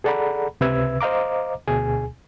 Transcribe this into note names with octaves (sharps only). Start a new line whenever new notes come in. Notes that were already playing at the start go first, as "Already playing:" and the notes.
G#4 A4 D5 F#5 A#5 B5
C#2 C3 B4 E5 E6 G#6
C5 D#5 F5 A#5 D6
D2 B2 G#4 G#5